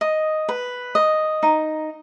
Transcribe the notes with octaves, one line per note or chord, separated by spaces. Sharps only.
D#5
B4
D#5
D#4